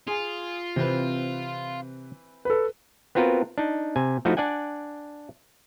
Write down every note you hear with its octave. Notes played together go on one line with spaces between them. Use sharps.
F4 G#4
C3 E3 C4 B4
A4 B4
B3 C4 F4 F#4 A#4 B4
D4 D#4
C3 G#5
F3 A3 D#4 E4 F#4
D4 D5 F#5 G#5